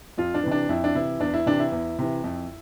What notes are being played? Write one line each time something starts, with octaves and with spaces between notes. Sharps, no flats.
F2 F4
D4
C3 E3
D4
F2 E4
D4
C3 E3 E4
E2 D4
E4
C3 E3 D4
E4
E2
C3 E3
F2